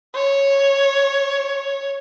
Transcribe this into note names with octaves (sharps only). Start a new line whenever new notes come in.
C#5